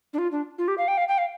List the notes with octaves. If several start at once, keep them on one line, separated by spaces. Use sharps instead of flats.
D4
F4
D4
F4
G4
F5
G5
F5
G5
F5